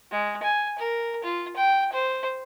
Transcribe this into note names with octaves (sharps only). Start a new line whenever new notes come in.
G#3
G#5
A#4
F4
G5
C5